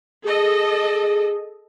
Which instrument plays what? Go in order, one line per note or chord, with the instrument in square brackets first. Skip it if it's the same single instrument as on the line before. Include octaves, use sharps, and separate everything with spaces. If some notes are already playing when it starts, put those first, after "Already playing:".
[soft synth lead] G#4 [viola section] A4 D#5